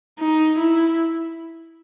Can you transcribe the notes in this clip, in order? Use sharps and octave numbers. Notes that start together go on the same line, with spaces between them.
D#4
E4